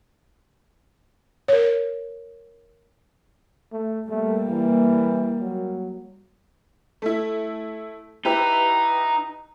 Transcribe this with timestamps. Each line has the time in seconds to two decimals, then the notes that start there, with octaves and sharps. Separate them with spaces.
1.48 A#4 C#5
3.72 A3
4.10 G3 A3 A#3
4.49 E3
5.41 F#3
7.02 A3 E4
8.25 D#4 E4 G4 B4